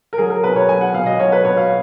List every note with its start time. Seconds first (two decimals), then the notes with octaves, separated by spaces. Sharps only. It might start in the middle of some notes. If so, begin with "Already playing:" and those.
0.13 A#4
0.18 F#3 G#4
0.30 A#4
0.44 B2 B4
0.56 C#5
0.69 F#3 G#5
0.81 F#5
0.94 B2 F5
1.06 D#5
1.19 F#3 C#5
1.32 B4
1.45 B2 C#5
1.57 F5